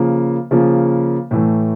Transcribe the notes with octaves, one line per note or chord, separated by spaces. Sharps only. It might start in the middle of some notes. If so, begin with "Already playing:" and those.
Already playing: C#3 F3 A#3
C#3 F3 A#3
A2 E3 A3